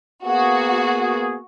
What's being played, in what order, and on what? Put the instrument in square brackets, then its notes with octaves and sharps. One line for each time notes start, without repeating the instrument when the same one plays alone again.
[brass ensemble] A#3 B3 G#4 [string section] F#4